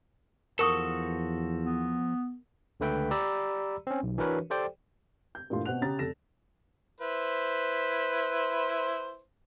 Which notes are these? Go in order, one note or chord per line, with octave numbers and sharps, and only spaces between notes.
E2 F3 F#4 A4 A#4 C#6 D#6
B3
C#2 D3 A3 B4 E5 G5
G4 D5 A#5 B5 E6
C4 C#4
B1
E3 D4 F#4 A#4 B4 C#5
G4 A4 C5 D5 G5
G6
G2 A#2 E3 A3 F4 C6
B2 C4 F#5 F#6 F7
C#3 C#4 G4 A#5 D#6 A6
F1 A4 A#6 E7
E4 B4 C5